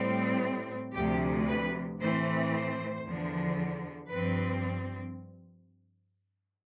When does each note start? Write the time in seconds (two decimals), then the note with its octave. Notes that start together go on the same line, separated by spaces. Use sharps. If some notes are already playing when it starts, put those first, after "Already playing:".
Already playing: A2 G3 C4
0.94 D2 C3 F3 G4
1.48 B4
2.00 A2 E3 A3 C4 C5
2.52 C5
3.05 E2 D3 F3
4.10 G2 F3 C4 B4